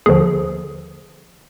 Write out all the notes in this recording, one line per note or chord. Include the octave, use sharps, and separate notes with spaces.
D#2 D3 F3 G#4